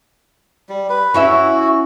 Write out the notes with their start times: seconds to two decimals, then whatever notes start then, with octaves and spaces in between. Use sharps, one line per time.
0.69 G3
0.89 B4
1.14 C#4 E4 F#4 E5